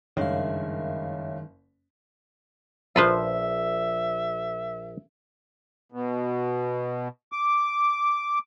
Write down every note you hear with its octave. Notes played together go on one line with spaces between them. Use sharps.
F#1 G2 D#3 G#3 C#5 E5 F5
A#1 F3 F4 B4 C5 E5
B2
D6